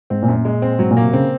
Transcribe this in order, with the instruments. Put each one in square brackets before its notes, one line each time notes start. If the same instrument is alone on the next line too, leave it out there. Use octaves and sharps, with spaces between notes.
[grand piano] G#2 [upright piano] C4
[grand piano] A#2
[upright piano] F#2
[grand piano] A#2
[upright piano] G#3
C4
[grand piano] G#2 [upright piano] F#3
[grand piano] A#2
[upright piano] A#3
[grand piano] C3
[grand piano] C#3 [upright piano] C4